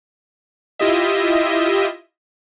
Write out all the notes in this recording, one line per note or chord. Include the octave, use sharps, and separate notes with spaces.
E4 F4 G4 D#5 E5